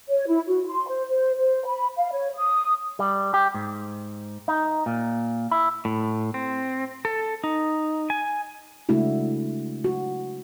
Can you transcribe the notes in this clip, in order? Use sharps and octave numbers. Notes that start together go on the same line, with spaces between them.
C#5
E4
F#4
C6
C5
C5
C5
B5
F5
C#5
D#6
G3
G4
G#2
D#4
A#2
E4
A2
C4
A4
D#4
G#5
C#3 G#3 A3 D4 E4 F#4
F#4